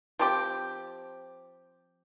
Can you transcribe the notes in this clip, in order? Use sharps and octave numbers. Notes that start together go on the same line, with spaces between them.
F3 C4 G4